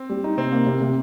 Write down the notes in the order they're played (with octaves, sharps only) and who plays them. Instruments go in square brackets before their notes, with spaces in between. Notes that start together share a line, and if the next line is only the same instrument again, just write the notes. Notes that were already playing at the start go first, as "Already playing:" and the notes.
Already playing: [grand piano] C4
[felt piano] G3
D#4
[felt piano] C3 [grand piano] C4
[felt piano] A#3
C3
C3